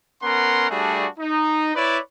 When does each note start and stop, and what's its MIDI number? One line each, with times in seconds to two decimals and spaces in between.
0.22 0.67 59
0.22 0.67 61
0.22 0.67 70
0.22 0.67 78
0.22 0.67 84
0.70 1.07 55
0.70 1.07 57
0.70 1.07 62
0.70 1.07 66
0.70 1.07 68
1.19 1.74 63
1.75 1.98 64
1.75 1.98 71
1.75 1.98 73
1.75 1.98 74